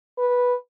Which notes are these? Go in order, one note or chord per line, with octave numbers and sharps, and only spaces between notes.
B4